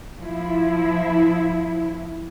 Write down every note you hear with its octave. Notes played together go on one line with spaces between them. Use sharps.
F3 E4